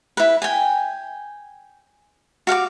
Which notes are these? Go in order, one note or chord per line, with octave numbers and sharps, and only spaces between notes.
E4 B4
G5 G#5
F#4 F5 F#5 D6